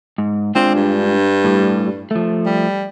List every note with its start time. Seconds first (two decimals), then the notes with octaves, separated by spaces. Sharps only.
0.18 G#2
0.55 G#3 C4 D4 F4
0.75 G2
1.44 A2 G3
2.11 F3 A3
2.46 G3